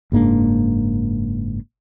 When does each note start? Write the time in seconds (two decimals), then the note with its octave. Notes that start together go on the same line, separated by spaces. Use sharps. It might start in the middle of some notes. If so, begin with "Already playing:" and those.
0.12 F#1 G#2 A#3 D4